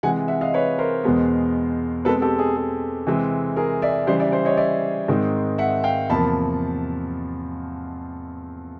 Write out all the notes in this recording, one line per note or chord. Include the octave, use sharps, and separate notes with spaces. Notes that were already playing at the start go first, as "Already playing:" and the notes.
C3 E3 G#3 F#5 G#5
E5 F#5
D#5 F5
B4 C#5
A#4 C5
E2 B2 G#3 B3
B2 G#3 C4 A4 B4
G4 A4
G#4
G#4
C3 E3 G#3 C4
G#4 A#4
D5 E5
C#3 E3 G3 C5 D5
D5 E5
C5 D5
C#5 D#5
D5 E5
G#2 D#3 G#3 C4
E5 F#5
F5 G5
E2 C3 F3 A#3 A5 B5